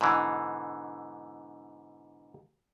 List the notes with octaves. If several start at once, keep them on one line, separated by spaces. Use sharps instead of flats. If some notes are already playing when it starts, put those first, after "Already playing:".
G#2 B2 D3 E3